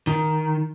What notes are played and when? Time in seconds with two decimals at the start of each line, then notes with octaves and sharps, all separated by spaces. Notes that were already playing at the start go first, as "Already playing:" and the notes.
0.07 D#3